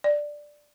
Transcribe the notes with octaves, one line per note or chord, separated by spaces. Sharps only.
D5